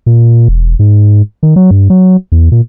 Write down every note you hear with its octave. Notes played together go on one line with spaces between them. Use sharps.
A#2
E1
G#2
D#3
F#3
G2
F#3
E2
A#2